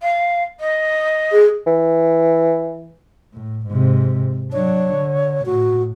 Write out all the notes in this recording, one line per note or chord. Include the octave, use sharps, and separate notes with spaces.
F5
D#5
G#4
E3
A2
G#2 C3
F#3 D4 C#5
D3
A2 F#4